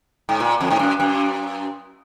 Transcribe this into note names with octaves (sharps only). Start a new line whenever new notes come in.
G#2
A#2
F2
G#2
F#2
F#2